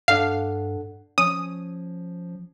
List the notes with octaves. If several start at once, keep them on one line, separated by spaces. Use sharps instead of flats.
G2 D4 A4 F5 F#5
F3 C#4 D#6